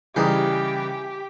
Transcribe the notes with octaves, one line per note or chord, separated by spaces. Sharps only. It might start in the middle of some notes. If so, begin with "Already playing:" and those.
C#3 E3 G3 D#4 G4 G#4 C5